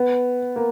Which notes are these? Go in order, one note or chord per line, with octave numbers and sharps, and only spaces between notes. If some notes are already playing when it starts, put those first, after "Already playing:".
Already playing: B3
A#3